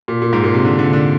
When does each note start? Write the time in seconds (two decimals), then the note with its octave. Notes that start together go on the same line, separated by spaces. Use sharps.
0.08 A#2
0.22 A#2
0.33 G#2
0.44 A#2
0.54 C3
0.65 D3
0.79 D3
0.93 D3